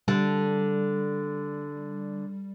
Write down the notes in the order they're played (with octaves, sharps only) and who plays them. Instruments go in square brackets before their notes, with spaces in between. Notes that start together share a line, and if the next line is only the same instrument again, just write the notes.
[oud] D3 [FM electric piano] G3